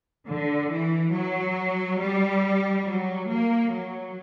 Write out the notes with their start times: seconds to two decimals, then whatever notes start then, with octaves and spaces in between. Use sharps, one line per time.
0.27 D3
0.70 E3
1.13 F#3
2.00 G3
2.85 F#3
3.29 A#3
3.71 F#3